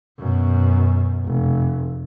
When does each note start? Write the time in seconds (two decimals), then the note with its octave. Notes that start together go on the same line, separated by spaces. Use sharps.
0.19 F#2 B2
1.25 F1